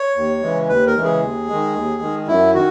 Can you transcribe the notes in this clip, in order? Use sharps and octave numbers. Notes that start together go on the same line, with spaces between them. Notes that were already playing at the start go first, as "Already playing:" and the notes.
Already playing: C#5
D#2
C#3 E3 G#3
D#2 B4
A#4
C#3 E3 G#3
G#4
D#2
D#3 G#3
D#2
D#3 G#3
F#2 E4
D#3 F#4